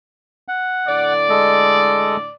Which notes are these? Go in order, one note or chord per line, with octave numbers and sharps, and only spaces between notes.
F#5
A2 D3 D5
G#3 A4 D#5